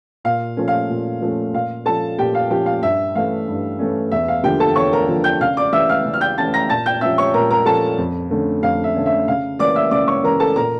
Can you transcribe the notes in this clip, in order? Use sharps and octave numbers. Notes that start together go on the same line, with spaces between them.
A#2 F5
F3 A3 C#4
F5
A#2
F3 A3 C#4
A#2 F5
F3 C#4 A4 A5
A#2 G4 G5
F5
F3 C#4 G4 G5
F5
G2 E5
E3 A3 C#4 F5
G2
E3 A3 C#4
E2 E5
F5
D3 F3 A#3 G4 G5
A4 A5
E2 C#5 C#6
A#4 A#5
D3 F3 A#3
G5 G6
C#3 F5 F6
D5 D6
E3 A3 C#4 E5 E6
F5 F6
C#3
F6
G5 G6
E3 A3 C#4 A5 A6
A#5 A#6
A#2 A5 A6
G5 G6
F3 C#4 E5 E6
C#5 C#6
A#2 A#4 A#5
A#4 A#5
F3 C#4 A4 A5
F2
D3 A3 C#4
F2 F5
E5
D3 A3 C#4
E5
C#3 F5
E3 A#3 C#4 D5 D6
E5 E6
C#3 D5 D6
C#5 C#6
E3 A#3 C#4 A#4 A#5
A4 A5
A#2 A#4 A#5